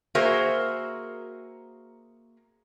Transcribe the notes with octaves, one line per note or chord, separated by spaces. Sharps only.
A#3 F#4 G#4 A#4 C5 E5